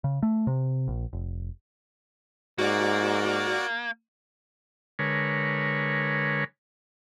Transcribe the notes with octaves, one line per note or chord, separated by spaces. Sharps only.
C#3
A3
C3
A#1
F1
G#2 A#3 F#4 D5
D3 G#3 A#4 B4 C#5